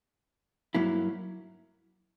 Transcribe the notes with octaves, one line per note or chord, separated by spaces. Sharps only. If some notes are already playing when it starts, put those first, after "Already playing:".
G2 F#3 A#3 E4